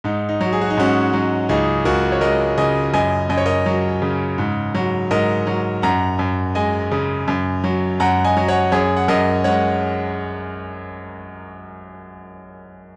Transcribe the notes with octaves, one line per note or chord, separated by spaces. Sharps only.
G#2 D#4
D#4
F#3
G#4
F#4
D#4
G#2 C#4 F#4
F#3
C#2 D#4 G#4
C#2 F#4 A#4
C#5
G#3 A#4 D#5
C#3 D#5 G#5
F#2 D#5 G#5
F#2 D#5
C#5
A#4 D#5
F#3
C#3
G#2
F#3
G#2 A#4 D#5
F#3
F#2 F#5 A#5
F#2
G#3 D#5 G#5
C#3
F#2
F#3
F#2 F#5 A#5
D#5 G#5
F#3
C#5 F#5
F#2 G#4 C#5
F#5
F#2 A#4 D#5
G#3 C#5 F#5